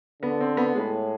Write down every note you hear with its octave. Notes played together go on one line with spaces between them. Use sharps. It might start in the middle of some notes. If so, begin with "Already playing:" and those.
D3 B3
C4
B3
A2 G#3